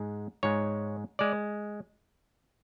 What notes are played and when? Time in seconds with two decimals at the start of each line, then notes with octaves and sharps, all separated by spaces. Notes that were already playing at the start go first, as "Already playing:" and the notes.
Already playing: G#2 G#3
0.43 G#2 G#3 C#5
1.19 G#3 D5